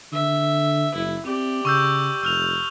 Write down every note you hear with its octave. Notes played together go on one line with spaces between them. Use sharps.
D3 E5
F#1 E4
C4 G4 D5
C#3 C#6 E6 G6
F1 E6 F6 F7